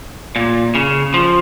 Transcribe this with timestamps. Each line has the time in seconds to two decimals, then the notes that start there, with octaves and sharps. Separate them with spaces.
0.36 A#2
0.75 C#3
1.14 F3